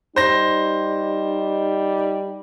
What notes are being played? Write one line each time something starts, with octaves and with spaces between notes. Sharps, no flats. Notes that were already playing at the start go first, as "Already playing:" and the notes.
G3 D#4 C5 A#6